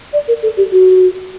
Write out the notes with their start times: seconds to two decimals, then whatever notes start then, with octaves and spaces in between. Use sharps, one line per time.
0.13 D5
0.28 A#4
0.43 A4
0.57 G4
0.72 F#4